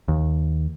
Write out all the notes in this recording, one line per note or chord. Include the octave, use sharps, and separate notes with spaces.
D#2